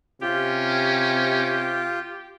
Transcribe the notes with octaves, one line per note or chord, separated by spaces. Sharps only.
C3 C#4 F4 G4